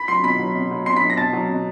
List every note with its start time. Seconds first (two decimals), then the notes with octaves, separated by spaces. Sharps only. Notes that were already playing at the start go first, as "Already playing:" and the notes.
Already playing: B5 B6
0.08 F#3 C6 C7
0.23 B2 B5 B6
0.39 F#3
0.55 B2
0.71 F#3
0.86 B2 C6 C7
0.96 B5 B6
1.02 F#3
1.10 A#6
1.17 B2 A5 A6
1.33 F#3
1.49 B2